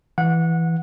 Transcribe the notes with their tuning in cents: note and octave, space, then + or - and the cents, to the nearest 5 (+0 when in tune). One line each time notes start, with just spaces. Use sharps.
E3 +0 F#5 -20